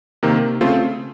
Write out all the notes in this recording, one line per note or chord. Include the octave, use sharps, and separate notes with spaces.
C3 D#3 A#3
C#3 A3 C4 F4 C5